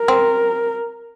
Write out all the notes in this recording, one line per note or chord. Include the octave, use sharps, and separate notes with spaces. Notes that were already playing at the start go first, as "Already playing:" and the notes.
Already playing: A#4
C4